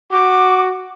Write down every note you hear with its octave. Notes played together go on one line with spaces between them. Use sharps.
F#4 D6